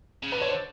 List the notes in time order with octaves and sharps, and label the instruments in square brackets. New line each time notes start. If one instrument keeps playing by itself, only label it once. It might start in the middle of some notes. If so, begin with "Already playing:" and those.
[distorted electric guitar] C#3
[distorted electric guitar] D3 [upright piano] B4
[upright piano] C#5
C5